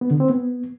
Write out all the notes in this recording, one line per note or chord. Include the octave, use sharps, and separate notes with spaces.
B3
D3
C4
B3